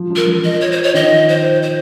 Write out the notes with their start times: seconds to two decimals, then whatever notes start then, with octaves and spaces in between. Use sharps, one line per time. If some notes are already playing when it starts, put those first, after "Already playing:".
Already playing: F3
0.10 F3
0.16 A#4
0.28 F3
0.44 D#5
0.61 C#5
0.72 C5
0.83 C#5
0.94 D#3 D#5
1.29 C5
1.62 C5